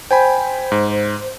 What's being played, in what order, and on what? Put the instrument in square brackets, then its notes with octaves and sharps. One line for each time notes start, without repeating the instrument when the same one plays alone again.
[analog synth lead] C5 [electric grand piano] G5 G#5 B5
[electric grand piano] G#2